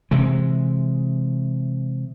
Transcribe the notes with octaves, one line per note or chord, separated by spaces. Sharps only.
C3 E3 G#3